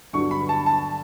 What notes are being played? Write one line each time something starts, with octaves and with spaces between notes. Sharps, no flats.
G2 D3 F#3 B3 C#6
B5
A5
A5